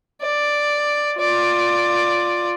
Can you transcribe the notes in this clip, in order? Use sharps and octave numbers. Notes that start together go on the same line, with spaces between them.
D5
F4 D5